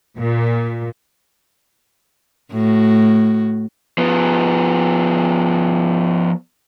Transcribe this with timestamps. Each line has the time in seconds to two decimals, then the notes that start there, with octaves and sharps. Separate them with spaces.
0.17 A#2
2.52 A2 F#4
3.98 F3 B3